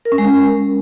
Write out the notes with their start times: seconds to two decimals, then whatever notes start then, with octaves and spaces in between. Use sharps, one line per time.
0.05 A#4
0.12 C#4
0.18 G#3